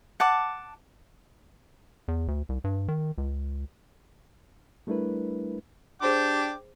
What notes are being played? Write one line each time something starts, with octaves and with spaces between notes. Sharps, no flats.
F#5 A5 D6
E2
D2
C2
G2
D#3
C#2
G3 A3 D4 E4 A#4 B4
D4 G#4 C5 G5 C6 D6